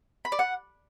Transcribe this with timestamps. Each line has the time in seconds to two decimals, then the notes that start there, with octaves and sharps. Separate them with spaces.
0.25 B5
0.32 D5
0.39 F#5